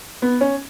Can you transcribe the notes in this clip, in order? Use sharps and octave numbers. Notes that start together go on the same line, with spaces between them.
B3
C#4